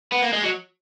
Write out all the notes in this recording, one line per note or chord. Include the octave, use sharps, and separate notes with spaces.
B3
A#3
G#3
F#3